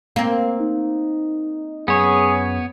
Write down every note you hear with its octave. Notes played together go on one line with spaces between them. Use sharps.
A#3 C4
D#4
F#2 B3 G#4 C#5